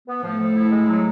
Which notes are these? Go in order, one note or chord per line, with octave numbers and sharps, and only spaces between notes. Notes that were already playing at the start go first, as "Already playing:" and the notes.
B3
A2 F3 A3
F3
E4
G#3
F#3